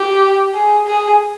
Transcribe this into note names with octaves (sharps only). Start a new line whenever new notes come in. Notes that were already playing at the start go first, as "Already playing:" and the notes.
Already playing: G4
G#4
G#4